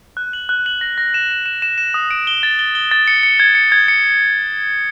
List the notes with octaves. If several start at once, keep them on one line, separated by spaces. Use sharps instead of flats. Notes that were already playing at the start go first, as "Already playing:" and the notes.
F#6
F#7
F#6
F#7
A#6
A#6
E7
E7
E7
E7
E7
D#6
D7
G7
A6
G7
G7
A6
C#7
C#7
G#6
C#7
G#6
C#7